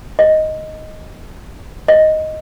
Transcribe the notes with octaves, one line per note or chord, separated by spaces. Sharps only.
D#5
D#5